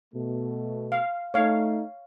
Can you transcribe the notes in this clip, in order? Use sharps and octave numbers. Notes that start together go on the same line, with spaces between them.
B2 A3
F5
A3 D#4 C#5 F5